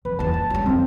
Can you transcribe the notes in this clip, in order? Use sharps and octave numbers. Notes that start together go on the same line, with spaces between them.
F2 B4
E2 A#3 A5
F3
F#3 G3
F2 B3 C4